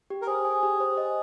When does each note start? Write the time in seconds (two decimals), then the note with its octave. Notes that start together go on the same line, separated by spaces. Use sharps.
0.10 G4
0.22 A#4
0.27 G#4 C5
0.45 G#5
0.63 G4
0.80 C5
0.97 D#5